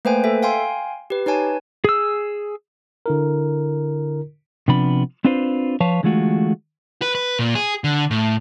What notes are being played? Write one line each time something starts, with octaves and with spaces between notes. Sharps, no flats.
A3 A#3 B4 C5 G5 G#5
A4 E5
F5 G5 G#5 C6
G4 B4
D#4 B4 C#5 G#5 A5
G#4 E6
D3 E4 A#4
C3 F3 B3 D4 B5
C4 D4 F4 B4 C5
F3 B4 C#5 F5 A5
D3 E3 G#3 A3 F4 F#4
B4
B4
A#2
G#4
D3
A2